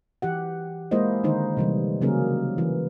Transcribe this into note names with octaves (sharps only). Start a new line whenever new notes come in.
E3 G4 F#5
G#3 A#3 E4 C5 D#5
D3 D#3 D#4 C5
C3 E3 G3
C#3 F#3 A#3 C#4 G#4 A#4
E3